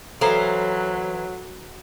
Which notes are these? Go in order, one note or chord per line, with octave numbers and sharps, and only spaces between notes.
E3 F#3 A4 C5 F5 A#5 C7